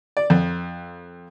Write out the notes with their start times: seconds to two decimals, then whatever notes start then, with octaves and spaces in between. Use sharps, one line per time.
0.17 D5
0.30 F2